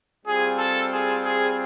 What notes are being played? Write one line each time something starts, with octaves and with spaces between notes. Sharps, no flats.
G3 C4 F4 G#4
A4
G#4
G#4